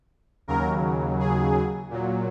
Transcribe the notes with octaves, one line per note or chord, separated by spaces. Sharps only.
D#2 C#3 F#3 A#4
G#4
A#2 F#3